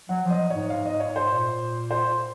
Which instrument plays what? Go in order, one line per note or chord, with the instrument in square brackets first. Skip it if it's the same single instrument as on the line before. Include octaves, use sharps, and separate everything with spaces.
[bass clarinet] F#3 [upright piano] F#5
[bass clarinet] F3
[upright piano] D#5
C#5
[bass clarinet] G#2
[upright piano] F5
D#5
C#5
C5
[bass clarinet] A#2
[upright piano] C5